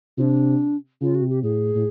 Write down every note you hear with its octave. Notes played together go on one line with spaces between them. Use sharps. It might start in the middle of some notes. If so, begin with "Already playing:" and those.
C3 D4 F4
C#3 F4
F#4
C3
G4
A2 G#4
A2